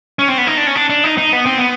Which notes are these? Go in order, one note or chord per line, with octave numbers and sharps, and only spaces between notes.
C#4
C4
B3
D#4
D4
C#4
D4
D4
D#4
D#4
B3
C4
B3